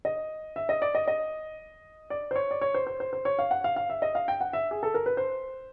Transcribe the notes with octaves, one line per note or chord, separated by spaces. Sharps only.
D#5
E5
D#5
D5
D#5
D#5
D5
C5
C#5
D5
C#5
C5
C5
C5
C5
C#5
F5
F#5
F5
F5
E5
D#5
F5
G5
F#5
E5
G#4
A4
A#4
B4
C5